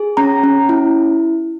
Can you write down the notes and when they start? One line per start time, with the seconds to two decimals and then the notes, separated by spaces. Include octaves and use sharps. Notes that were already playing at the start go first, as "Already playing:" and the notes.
Already playing: G#4
0.17 C#4 A#5
0.44 C#4
0.69 E4